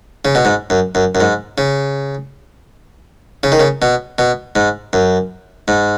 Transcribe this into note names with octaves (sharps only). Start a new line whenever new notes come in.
C#3
B2
G#2
F#2
F#2
F#2
G#2
C#3
C#3
D#3
C#3
B2
B2
G#2
F#2
G#2